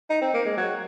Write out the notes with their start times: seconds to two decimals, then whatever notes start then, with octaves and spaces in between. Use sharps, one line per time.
0.10 D#4
0.21 C4
0.33 A#3
0.46 G#3
0.57 F#3